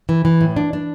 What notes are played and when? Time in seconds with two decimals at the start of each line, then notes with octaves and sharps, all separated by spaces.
0.09 E3
0.25 E3
0.41 A2
0.56 D4
0.73 D4